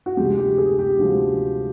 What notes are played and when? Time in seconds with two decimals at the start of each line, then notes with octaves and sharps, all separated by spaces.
0.06 F#4
0.17 D2 C3 F3 G#3 G4
0.38 G4
0.58 G#4
0.79 G4
0.99 D2 C3 F3 G#3 F#4